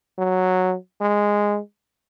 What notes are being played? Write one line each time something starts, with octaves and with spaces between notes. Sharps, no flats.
F#3
G#3